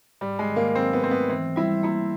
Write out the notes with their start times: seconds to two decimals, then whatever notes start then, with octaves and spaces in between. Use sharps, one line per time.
0.21 G#2 G3
0.39 G#3
0.48 D#3
0.56 A#3
0.75 F#3 C4
0.93 B3
1.02 A3 C4
1.11 B3
1.29 E3 C4
1.56 G3 E4
1.83 A#3 E4